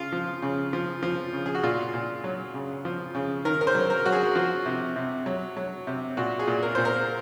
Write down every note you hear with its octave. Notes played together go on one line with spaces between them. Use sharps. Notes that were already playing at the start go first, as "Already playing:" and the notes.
Already playing: C#3 F4
F3
C#3
F3
F3
C#3
G#4
F#4
A#2 F4
A#2
F#3
C#3
F3
C#3
D#3 A#4
A#4
C5
F#3
A#4
F#3 F#4
G#4
F3 F#4
C3
C3
F#3
F#3
C3
A#2 F#4
G#4
A#2
A#4
A#2 C5
A#4